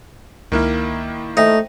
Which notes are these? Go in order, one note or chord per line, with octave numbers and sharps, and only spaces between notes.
C#2 D#3 A#3 E4 F6
A3 D#4 C5 E5 G5